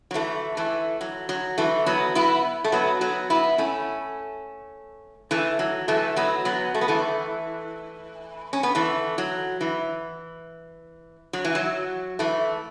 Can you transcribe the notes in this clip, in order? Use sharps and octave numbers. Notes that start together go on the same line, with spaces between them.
F#3
E3 A3
E3 A3
F#3
F#3
E3 A3
F#3 B3
B3 E4
A3
F#3 B3
F#3 B3
B3 E4
A3 C#4
E3 A3
F#3
E3 A3
F#3 B3
F#3 B3
A3
B3
E3 A3
C#4
B3
E3 A3
F#3
E3
F#3
E3
F#3
E3 A3